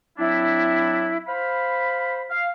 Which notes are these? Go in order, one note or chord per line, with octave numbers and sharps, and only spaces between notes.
F#3 C4 D4 E4
C5 F5 B5
F5